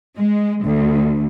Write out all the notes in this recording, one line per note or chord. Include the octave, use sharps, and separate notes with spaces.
G#3
D2